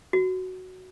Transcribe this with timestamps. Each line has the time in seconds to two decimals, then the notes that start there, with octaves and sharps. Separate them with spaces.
0.13 F#4